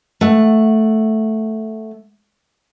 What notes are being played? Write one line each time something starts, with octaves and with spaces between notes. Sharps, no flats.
A3 F#5